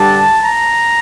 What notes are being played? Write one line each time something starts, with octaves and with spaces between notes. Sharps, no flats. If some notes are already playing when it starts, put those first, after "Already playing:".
Already playing: G2 D3 G3 D4 A5
A#5